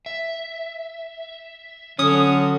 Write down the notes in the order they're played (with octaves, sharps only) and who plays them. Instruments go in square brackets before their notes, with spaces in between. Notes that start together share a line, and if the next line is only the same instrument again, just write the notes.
[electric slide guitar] E5
[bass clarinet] D3 [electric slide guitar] F#3 [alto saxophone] C#4 [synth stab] D#6